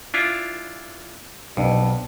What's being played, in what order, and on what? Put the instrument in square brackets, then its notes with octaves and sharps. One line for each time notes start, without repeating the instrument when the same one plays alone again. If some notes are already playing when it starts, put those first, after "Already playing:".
[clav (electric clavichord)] D4 E4 F4
[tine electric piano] B1 [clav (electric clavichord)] F2 [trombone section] B3 D4